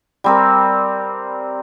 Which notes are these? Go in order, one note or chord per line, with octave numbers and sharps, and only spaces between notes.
G3 C4 A#4